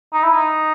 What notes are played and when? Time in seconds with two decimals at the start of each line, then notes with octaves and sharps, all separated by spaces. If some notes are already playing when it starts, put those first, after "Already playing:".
0.13 D#4
0.23 E4
0.33 D#4